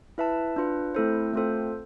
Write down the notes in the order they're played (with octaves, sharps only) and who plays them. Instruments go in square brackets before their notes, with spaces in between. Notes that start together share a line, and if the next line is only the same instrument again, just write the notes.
[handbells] E4 B4 E5 A5
D4 F4 B4
A3 C4 E4 A4 C5
A3 C4 F4 A4 C5